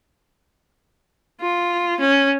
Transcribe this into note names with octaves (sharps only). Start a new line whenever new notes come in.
F4
C#4